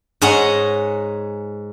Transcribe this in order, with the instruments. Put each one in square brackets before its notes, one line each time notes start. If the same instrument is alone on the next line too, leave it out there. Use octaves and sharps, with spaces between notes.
[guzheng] G#2 G#4 C#5 D#5 F#5